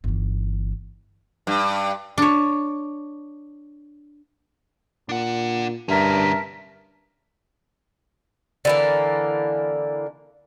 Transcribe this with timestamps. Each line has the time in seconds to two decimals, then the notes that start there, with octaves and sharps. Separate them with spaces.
0.04 G1 E3
1.47 G2
2.18 D4 C#5
5.09 A#2 D4 F#5
5.89 G2 D3 C#4 A#4 E5 A5
8.65 D3 E3 A#3